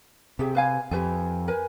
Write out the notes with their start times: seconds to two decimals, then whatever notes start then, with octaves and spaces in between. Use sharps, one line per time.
0.39 C3 G4 G#4 E5
0.55 B4 F5 G#5
0.91 F2 G4 B4 G#5
1.48 A#4 B4 G#5